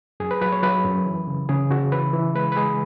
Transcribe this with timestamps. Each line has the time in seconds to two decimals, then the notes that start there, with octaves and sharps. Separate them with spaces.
0.20 F#2 G#4
0.31 B4
0.41 F#3 B4
0.52 C#5
0.63 F#3 B4
0.85 F#2
1.06 E3
1.27 C#3
1.49 C#3 G#4
1.71 C#3 F#4
1.92 E3 B4
2.13 E3
2.35 G#3 B4
2.52 B4
2.57 G#3 G#4